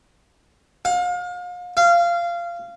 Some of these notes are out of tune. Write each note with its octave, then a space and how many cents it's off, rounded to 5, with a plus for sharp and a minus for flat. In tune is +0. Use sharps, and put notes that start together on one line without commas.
F5 +35
F5 -20